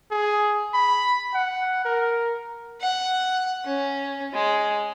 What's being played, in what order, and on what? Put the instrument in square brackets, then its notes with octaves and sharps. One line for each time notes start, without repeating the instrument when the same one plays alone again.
[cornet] G#4
B5
F#5
A#4
[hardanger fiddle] F#5
C#4
G#3